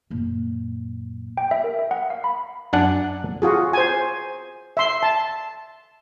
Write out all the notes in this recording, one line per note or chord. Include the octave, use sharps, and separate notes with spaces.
F#2 A#2
G5
E5
A#4
E5
F#5
F5
B5
F#2 D4 F#5 G#5
F4 F#4 G#4
C5 G#5
E5 C6
A5